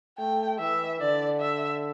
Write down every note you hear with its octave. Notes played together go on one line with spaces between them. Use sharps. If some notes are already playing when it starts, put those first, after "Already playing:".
A3 G5
E3 E5
D3 D5
E5